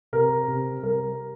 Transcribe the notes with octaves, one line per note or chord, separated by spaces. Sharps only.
C3 A#4
C3
G3 A#4